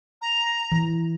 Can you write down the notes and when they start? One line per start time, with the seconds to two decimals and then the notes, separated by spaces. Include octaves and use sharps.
0.21 A#5
0.72 E3